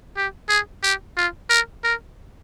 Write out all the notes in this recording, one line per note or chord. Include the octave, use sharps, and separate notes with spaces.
G4
G#4
G4
F4
A#4
A#4